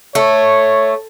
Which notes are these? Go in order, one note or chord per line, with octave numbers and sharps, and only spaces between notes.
A3 C#5